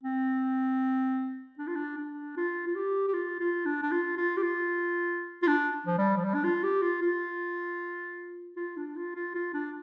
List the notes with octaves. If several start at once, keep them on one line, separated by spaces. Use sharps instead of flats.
C4
D4
F4
D4
D4
F4
F4
G4
G4
F4
F4
D4
D4
F4
F4
G4
F4
F4
D4
F3
G3
F3
G3
D4
F4
G4
F4
F4
F4
D4
F4
F4
F4
D4